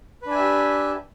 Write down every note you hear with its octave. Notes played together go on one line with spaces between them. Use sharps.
D4 G4 B4 E5 G#5